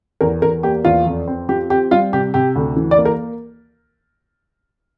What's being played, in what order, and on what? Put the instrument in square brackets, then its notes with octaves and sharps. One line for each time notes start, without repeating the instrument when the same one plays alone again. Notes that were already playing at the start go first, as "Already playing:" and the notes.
[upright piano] E2 A#4
E2 A#4
A#3 G4
E2 F4
F2
C4
F3 G4
C4 G4
G3 F4
C3 G4
C3 G4
D2
E3
D5
A#3
A#4